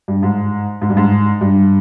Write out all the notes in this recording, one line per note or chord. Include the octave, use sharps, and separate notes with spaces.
G2
G#2
G#2
G2
G#2
G2